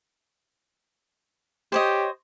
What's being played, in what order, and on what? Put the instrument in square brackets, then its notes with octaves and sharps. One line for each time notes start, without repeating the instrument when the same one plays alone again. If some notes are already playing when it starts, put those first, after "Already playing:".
[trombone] G4 [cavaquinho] C5 C#5 D#5